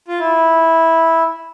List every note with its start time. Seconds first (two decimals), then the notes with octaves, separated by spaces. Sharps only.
0.08 F4
0.19 E4